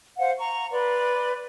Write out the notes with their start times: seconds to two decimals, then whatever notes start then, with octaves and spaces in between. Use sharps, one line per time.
0.18 C5 F5 F#5
0.39 A#5 C#6
0.72 B4 D5 C6